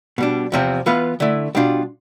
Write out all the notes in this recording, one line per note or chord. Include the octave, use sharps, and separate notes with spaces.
B2 G3 D4
E2 C3 F3 C4
E3 B3 F4 B4 F5
D3 A3 E4
B2 G3 D4 F4